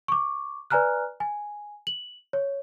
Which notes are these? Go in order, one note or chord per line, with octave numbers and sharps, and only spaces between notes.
C#6 D6
B4 D5 G#5 A#5 F6 F#6
G#5
F#7
C#5